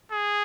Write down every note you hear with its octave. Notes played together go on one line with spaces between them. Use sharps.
G#4